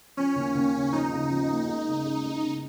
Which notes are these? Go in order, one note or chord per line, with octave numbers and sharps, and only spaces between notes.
F3 C#4
D#2
D#2
C#3
F3 D#4
C#3
F3
A#3
G#3
C#3
G#3
G#3
C#3